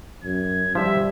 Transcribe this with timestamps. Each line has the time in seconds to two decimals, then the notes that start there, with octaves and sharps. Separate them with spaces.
0.24 F#2 G#6
0.75 F3 G3 E5